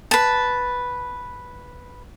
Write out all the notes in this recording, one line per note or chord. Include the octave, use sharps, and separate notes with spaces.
B4 A5